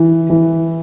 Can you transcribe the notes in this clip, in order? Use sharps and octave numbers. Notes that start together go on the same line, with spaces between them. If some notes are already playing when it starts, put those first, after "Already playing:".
Already playing: E3
E3